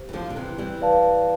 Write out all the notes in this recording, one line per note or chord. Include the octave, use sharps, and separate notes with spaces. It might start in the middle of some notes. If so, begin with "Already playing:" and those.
Already playing: G4 C5
E3
D3 F3
D3
C3 E3
E3 G3
B4 D5 F5 A5